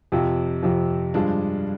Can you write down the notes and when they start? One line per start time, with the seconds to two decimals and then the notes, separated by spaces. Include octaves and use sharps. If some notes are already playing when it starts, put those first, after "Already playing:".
0.12 F2 C3 F3
0.63 F2 C3 F3
1.14 G2 F3 G#3 D4